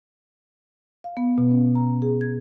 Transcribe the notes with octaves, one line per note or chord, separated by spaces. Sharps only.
F5
B3
B2
C#4
A#5
G#4
G#6